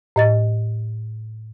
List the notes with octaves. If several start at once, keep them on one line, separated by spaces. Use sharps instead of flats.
A2 D#5 A6